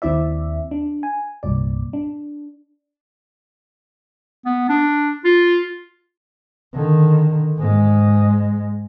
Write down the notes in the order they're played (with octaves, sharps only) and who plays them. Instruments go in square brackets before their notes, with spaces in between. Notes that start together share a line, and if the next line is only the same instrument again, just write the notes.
[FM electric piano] D#2 C4 E4 D5 E5
D4
G#5
C2 G2 A#2 D5
D4
[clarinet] B3
D4
F4
[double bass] D3 D#3
G#2 G#3